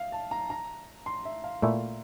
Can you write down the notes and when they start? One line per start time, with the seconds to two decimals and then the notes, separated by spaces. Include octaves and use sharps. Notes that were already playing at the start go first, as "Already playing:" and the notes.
Already playing: E5 F5
0.12 A5
0.31 A#5
0.50 A#5
1.06 C6
1.25 E5
1.44 F5
1.62 A#2 A3 E4